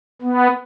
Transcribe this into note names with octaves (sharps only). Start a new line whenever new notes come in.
B3